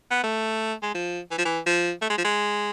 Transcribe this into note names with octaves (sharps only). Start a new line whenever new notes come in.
B3
A3
G#3
F3
E3
F3
E3
F3
A3
G#3
F3
G#3